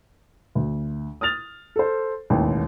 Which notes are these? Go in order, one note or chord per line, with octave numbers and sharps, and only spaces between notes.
D2
D#6 F6 A6 F7
A4 C5
E1 A1 D#2